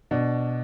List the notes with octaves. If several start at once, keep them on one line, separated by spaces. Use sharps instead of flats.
B2 D4